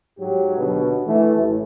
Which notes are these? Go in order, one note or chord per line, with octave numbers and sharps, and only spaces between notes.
G#2 F#3 G4
D#2 B2 D3 B4
E3 A3
A1